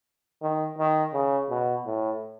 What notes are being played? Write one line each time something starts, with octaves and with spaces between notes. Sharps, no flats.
D#3
D#3
C#3
B2
A2